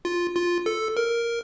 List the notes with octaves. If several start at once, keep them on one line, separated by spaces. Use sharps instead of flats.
F4
F4
A4
A#4